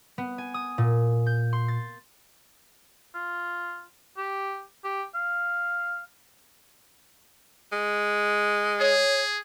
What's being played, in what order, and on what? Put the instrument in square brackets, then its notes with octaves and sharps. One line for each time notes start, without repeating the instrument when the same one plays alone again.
[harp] B3
G#5
D#6
A#2
G6
C6
A6
[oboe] F4
G4
G4
F5
[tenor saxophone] G#3
[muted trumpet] G#4 [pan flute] C#5